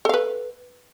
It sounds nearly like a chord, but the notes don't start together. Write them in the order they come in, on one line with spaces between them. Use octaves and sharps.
A4 F5 B4